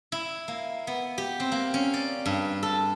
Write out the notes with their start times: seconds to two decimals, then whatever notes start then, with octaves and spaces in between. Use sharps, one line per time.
0.12 E4
0.48 A#3
0.87 B3
1.18 G4
1.40 C4
1.52 A#3
1.74 C#4
1.94 D5
2.26 G2
2.63 A4